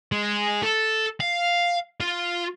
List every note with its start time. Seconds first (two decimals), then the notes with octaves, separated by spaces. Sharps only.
0.12 G#3
0.63 A4
1.20 F5
2.00 F4